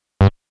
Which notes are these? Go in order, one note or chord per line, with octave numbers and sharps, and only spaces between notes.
G2